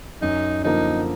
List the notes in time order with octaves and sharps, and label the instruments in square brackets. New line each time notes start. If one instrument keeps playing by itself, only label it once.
[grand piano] F#2 [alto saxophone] D#4
[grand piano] D3 F3 A#3 [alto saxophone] D#4